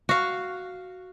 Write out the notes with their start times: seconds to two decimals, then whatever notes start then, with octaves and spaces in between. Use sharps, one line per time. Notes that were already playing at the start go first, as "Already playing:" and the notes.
0.09 F#4 F5